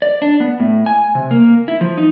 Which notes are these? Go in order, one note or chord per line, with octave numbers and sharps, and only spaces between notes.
D5
D4
B3
A2
G#5
C3
A#3
E4
F3
D#4